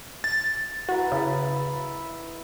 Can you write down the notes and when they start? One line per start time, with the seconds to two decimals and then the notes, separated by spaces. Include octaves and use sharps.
0.24 A6
0.89 E4 F#4 B4 A#5
1.12 C#3 E4 B4 D#5